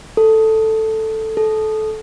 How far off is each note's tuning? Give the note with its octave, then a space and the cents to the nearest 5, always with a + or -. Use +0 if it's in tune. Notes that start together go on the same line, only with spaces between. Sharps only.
A4 +5
A4 -20